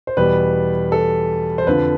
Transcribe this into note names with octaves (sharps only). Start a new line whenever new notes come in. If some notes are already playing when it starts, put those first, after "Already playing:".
C5
E2 B2 G3 B4
A4
C5
F2 D3 F3 B4